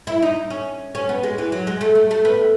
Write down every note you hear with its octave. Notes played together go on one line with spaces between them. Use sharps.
E4
D#4
C#4
C#4
B3
G#3
E3
F#3
G#3
A3
A3
A3
B3